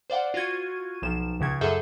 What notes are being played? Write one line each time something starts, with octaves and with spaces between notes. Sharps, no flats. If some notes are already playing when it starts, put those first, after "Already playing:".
C5 D5 F5 F#5
F4 F#4 C#6 G#6 D#7
B1 F3 E7
C#2 C#3 G#6
F#2 G#4 A4 E5 G6